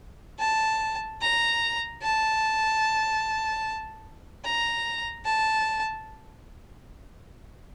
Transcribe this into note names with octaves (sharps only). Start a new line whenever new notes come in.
A5
A#5
A5
A#5
A5